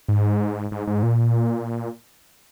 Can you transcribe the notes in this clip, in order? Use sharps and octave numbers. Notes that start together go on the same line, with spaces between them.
G#2
G#2
G#2
A#2